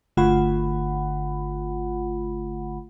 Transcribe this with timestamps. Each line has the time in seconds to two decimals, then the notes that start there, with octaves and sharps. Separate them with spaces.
0.17 G1 D3 A3 F4 F#5 B5